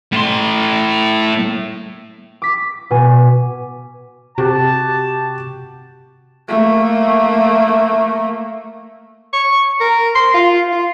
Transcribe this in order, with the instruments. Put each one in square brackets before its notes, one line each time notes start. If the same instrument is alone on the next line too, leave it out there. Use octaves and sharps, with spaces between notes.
[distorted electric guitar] A2 C6
[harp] D6 B6
B2 G#5
[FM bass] C3 [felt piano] F#4 G4 [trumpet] A5
[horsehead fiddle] A3 A#3
[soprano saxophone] C#6
A#4
C6
F4
F4